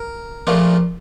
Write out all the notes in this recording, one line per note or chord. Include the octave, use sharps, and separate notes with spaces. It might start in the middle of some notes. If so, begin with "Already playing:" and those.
Already playing: A#4
A#1 A#2 F3 A3 D4